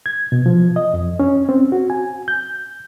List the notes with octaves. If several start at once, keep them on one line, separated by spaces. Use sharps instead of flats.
G#6
B2
F3
D#5
F2
C#4
C4
F#4
G#5
G6